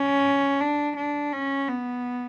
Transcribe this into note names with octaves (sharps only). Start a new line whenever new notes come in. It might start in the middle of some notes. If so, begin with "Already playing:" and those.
Already playing: C#4
D4
D4
C#4
B3